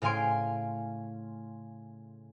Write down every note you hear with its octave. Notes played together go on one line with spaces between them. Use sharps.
A2 C#3 F5 G#5 C6 D7